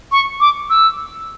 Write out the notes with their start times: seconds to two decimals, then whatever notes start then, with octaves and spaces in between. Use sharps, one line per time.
0.12 C#6
0.40 D6
0.70 E6